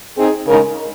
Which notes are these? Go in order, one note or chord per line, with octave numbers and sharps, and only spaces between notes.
C4 D#4 G#4
C#3 G#3 D#4 A#4